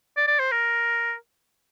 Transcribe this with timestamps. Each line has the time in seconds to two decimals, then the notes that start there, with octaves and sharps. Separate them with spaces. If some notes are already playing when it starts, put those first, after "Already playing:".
0.17 D5
0.28 D5
0.39 C5
0.52 A#4